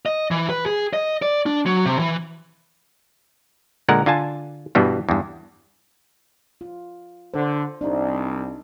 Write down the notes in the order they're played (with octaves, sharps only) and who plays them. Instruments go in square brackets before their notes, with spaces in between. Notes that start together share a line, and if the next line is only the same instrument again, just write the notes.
[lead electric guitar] D#5
E3
B4
G#4
D#5
D5
D4
F#3
C3
E3
[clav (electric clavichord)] A#2 D3 G#3 A#4 F#5
D3 F4 G#5 A5
G2 B2 E3 G3 B3
E2 G2
[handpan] F4
[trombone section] D3 [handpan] C5
[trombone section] C2 [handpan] D4 D#4